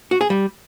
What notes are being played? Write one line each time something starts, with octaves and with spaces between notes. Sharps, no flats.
F#4
G#4
G3